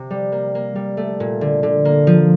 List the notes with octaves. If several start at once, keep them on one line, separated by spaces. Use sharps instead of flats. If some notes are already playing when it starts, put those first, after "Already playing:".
Already playing: C3
G3
A#3
A#3
G3
A3
A#2
D3
D3
A#3
F3